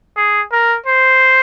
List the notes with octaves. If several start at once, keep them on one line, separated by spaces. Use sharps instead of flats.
G#4
A#4
C5